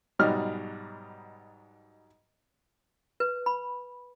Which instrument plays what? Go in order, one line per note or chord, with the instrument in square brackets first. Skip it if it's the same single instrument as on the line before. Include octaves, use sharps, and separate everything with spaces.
[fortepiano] G#2 B2 F#3 G3 D#4 F6
[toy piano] B4
B5